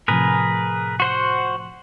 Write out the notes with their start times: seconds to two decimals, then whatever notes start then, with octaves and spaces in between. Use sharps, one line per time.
0.08 A2 C3 F3 G#4 A#4 B4
1.00 F#4 C5 F#5